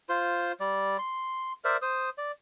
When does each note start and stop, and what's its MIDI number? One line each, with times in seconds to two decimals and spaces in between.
0.09 0.52 65
0.09 0.52 72
0.09 0.52 84
0.60 0.97 55
0.60 0.97 74
0.99 1.53 84
1.65 1.77 70
1.65 1.77 72
1.65 1.77 74
1.65 1.77 76
1.82 2.10 72
1.82 2.10 87
2.18 2.32 74